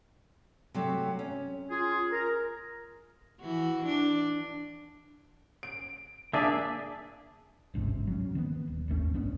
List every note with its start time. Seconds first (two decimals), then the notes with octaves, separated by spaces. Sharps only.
0.74 C3 F#3 A3
1.19 C#4
1.71 F4 G#4
2.12 A#4 A#5
3.42 E3 F#4
3.86 D4
5.63 D7
6.33 A#3 D4 G#4 E5 A5 D6
7.74 G1 C#2 G#2 C3
8.07 F#3 C#4
8.35 D#3 A#3 B3
8.67 D#1
8.88 G#1 D#2 A3 C#4
9.14 B1 G2 B3 C#4